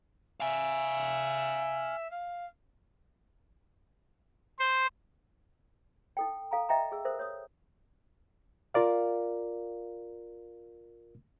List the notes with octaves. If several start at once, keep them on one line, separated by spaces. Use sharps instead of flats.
E5 F5 G#5
F5
C5
D#4 A4 G5
A4 F5 G#5 A#5
D#5 E5 G5 A#5
G#4 E6
A4 A#4 C5 E5
C#5 D#6
F4 A#4 D5 F5